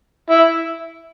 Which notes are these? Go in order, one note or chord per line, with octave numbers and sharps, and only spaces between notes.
E4